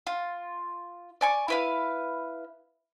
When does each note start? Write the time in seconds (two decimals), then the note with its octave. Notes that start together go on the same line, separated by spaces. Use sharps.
0.07 F4
1.21 D5 G#5 C#6
1.48 E4 B4 F5